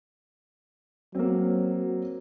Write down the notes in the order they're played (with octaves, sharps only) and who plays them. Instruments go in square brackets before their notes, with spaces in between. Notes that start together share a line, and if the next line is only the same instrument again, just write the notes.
[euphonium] F#3 [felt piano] A#3 C4